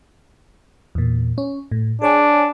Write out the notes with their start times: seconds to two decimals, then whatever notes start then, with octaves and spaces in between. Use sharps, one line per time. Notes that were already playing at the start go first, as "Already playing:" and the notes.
0.95 E2 A#2
1.38 C#4
1.72 A2
2.02 D4 G#4 C#5 G#5